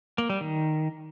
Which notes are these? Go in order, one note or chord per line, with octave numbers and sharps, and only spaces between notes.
A#3
G3
D#3